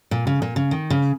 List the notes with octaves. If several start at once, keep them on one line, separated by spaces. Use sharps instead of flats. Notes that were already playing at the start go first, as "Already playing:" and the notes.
A#2
C#3
A#2
C#3
D#3
C#3